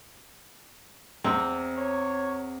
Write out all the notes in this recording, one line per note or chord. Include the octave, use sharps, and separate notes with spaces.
E2 C4 A#5
C#5